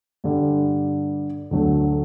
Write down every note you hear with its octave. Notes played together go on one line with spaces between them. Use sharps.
G2 D3 G3
D2 D3 F#3 A3